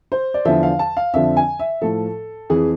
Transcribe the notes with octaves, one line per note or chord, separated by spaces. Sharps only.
C5
D5
E2 D3 F3 E5
F5
A5
F5
F2 D3 F3 E5
G#5
E5
A2 F3 A4
F2 E3 G#4